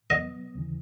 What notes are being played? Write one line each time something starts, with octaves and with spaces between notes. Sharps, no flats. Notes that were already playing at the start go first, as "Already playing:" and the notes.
B2 F#3 B3 D#5
D#2 C#3 E3